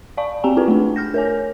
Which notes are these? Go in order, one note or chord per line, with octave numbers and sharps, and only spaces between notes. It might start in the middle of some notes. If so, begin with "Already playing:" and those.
D5 F5 A5 C#6
C4 G4 G5 G#5 A#5
E4 F4 G#4 B4
A3 D4
F6 G6 A#6
A#4 C#5 G#5